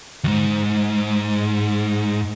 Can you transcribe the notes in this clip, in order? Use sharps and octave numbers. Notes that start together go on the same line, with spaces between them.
D#2 G#2